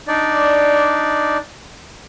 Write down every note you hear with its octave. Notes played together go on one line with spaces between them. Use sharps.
D4 D#4 D5